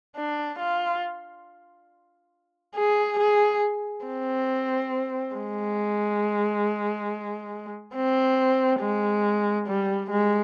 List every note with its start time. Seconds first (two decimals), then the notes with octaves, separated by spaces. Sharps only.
0.16 D4
0.59 F4
2.75 G#4
3.19 G#4
4.05 C4
5.35 G#3
7.95 C4
8.80 G#3
9.67 G3
10.11 G#3